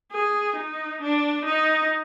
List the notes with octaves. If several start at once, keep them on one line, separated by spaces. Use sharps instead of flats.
G#4
D#4
D4
D#4